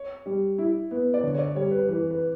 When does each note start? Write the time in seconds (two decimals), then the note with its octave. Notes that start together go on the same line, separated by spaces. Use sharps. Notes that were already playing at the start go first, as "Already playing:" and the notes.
Already playing: C#5
0.26 G3
0.58 E4
0.91 B3
1.14 D5
1.23 D3 C#5
1.34 C#5
1.39 D5
1.55 G3 C#5
1.71 B4
1.88 E3 B4
2.11 B4